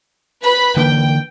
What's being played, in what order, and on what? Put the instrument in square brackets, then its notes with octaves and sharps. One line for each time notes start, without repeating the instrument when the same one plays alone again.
[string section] B4 B5
[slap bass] D3 E3 A#3 [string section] G5